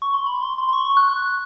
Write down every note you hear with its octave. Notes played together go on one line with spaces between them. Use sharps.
C#6
C6
B5
C6
C6
C6
C#6
C#6
F#6
F#6